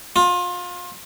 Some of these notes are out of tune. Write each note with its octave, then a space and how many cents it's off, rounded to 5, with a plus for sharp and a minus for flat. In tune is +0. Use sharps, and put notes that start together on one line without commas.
F4 +30